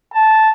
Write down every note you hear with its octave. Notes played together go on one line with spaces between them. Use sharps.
A5